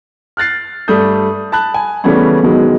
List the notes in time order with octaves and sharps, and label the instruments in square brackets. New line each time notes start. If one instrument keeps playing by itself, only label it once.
[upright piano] F6 F#6 A6 C7
G2 G3 A3 A4 D#6 G6
A5 B5 F#6
G#5
C#3 E3 G3 A3 B3 C#4
B2 D#3 F#3 G#3